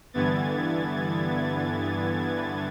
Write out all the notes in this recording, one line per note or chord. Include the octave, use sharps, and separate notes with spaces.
G2 D3 E3 B3 G#6 A6